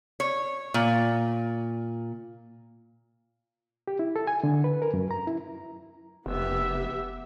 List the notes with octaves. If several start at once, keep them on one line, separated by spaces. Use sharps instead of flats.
C#5
A#2
G4
E4
A4
G#5
D3
B4
A#4
F#2
A#5
E4
F1 B3 G4 E5